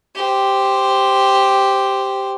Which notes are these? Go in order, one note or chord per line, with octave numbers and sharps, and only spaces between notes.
G4 C5